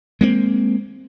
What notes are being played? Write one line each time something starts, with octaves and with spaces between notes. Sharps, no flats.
G#3 A#3 C4